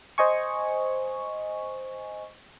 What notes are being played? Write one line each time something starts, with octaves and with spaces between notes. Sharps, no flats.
C5 D#5 G#5 C#6